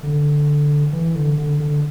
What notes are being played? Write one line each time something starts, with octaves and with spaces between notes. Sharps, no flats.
D3
E3
D3
D3
D3